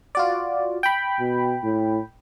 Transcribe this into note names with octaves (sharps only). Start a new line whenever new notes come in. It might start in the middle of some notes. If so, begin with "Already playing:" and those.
F4 F#4 D5
G5 B5
B2
A2